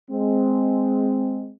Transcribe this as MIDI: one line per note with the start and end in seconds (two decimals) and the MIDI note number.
0.11 1.51 56
0.11 1.51 60